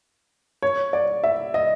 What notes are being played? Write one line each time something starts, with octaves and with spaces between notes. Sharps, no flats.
C#5
D5
E5
D#5